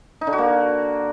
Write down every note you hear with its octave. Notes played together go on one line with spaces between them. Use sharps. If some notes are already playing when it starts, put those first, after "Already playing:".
D#4
D3
F#4
A#3